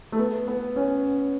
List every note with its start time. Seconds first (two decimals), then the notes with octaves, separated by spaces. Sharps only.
0.12 A3
0.19 B3
0.48 B3
0.76 C#4